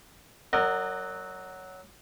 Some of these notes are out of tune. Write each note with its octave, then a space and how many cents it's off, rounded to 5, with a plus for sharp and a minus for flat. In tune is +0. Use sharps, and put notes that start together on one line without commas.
F#3 +5 A#4 -25 D#5 -45